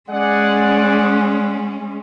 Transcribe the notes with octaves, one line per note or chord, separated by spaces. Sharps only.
G#3 C#4 G#4 D5 F#5